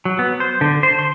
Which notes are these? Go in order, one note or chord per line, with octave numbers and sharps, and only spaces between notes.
F#3
B3
C5
D3
C5
C6